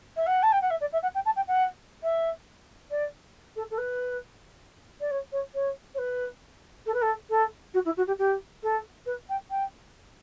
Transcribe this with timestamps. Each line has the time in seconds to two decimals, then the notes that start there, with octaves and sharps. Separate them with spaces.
0.16 E5
0.27 F#5
0.43 A5
0.52 G5
0.62 F#5
0.70 E5
0.81 D5
0.93 E5
1.03 F#5
1.15 G5
1.25 A5
1.36 G5
1.47 F#5
2.03 E5
2.90 D5
3.56 A4
3.71 A4
3.78 B4
5.00 D5
5.11 C#5
5.32 C#5
5.54 C#5
5.94 C#5
5.98 B4
6.86 A4
6.94 B4
7.02 A4
7.30 A4
7.74 F#4
7.85 E4
7.97 F#4
8.07 G4
8.18 G4
8.63 A4
9.06 B4
9.29 G5
9.50 G5